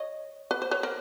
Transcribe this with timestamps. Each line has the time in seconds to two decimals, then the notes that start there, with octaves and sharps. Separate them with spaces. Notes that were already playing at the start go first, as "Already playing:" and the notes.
Already playing: C#5 D#5
0.51 B4
0.62 C5
0.71 B4 C#5
0.83 A#4 C5